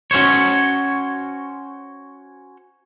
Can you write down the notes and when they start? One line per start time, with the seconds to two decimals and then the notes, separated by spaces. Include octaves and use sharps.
0.11 C#4 F#4 C5 C#5